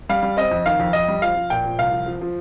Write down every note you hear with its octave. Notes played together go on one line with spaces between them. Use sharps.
G3 F5
G3
C4 D#5
F2
D#3 F5
F2
F2 D#5
G3
F3 F5
F3
A#2 G5
F3
C2 F5
F3
F3
F3